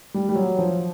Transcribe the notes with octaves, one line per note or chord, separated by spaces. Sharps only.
G3
G3
F#3
F3